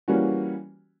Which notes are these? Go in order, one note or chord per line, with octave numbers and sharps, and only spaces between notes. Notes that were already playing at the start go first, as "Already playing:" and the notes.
E3 G3 A#3 C#4 F#4